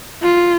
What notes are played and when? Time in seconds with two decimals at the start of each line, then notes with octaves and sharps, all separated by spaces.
0.22 F4